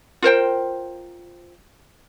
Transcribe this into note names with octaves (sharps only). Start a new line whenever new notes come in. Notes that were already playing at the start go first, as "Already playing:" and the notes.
F4 A#4 C5 G5